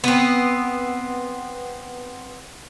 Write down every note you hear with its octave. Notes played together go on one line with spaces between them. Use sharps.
B3 C4